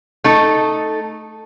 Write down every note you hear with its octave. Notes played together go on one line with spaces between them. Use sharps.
A3 D#4 A4